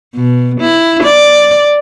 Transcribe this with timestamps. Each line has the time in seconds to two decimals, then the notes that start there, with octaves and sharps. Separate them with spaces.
0.15 B2
0.61 E4
1.03 D5